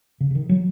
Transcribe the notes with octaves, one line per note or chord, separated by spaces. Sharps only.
C#3
C#3
D#3
F#3